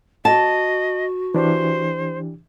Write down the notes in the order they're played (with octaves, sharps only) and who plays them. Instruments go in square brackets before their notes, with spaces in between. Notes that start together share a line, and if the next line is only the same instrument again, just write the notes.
[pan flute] F#4 [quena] D#5 [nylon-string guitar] A5
[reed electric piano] E3 D4 G4 [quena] C5